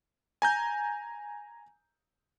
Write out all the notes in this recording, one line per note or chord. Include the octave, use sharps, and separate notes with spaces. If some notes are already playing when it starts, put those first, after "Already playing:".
G#5 A#5 G6